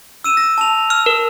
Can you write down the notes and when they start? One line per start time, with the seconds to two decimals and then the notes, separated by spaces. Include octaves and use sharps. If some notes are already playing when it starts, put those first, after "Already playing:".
0.24 E6 D#7 E7
0.37 A#6
0.58 A5 F7
0.90 F6
1.06 A#4